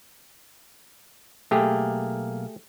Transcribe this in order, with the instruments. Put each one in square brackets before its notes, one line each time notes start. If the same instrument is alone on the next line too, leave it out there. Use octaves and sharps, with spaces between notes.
[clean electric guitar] B1 A#3 [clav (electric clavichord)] A3 G4 G#4